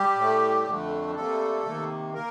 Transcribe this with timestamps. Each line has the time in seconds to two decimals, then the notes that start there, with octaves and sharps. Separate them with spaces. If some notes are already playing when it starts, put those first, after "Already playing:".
Already playing: G3 G4
0.16 A2
0.21 A3
0.66 F2 D3 A3
1.15 C3 G3 A3 A#3 A4
1.66 C3 D#3 A#3
2.14 A#3 A#4